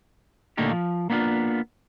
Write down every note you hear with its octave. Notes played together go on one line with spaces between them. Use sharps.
A#2 D3 A3 A#3 D#4 G4
F3
A#3 B3 D4 D#4 F4